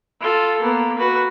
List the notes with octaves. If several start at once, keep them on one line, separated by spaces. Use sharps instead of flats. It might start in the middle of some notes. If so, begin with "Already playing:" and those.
F4 A4
A#3 B3
F#4 B4